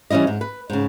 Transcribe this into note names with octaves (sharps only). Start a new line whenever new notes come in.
E3 G3 C#4 E4 D#5
G#2
B4
G#2 C#3